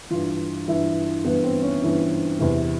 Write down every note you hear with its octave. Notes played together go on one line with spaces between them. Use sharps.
G2 E3 F4
G2 E3 E4
G2 E3 B3
C4
C#4
G2 E3
E2 C3 E3